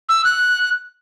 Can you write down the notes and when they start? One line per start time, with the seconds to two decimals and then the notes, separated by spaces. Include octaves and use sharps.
0.09 E6
0.24 F#6